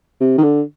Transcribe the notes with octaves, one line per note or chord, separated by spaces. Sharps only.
C3
D#3
D3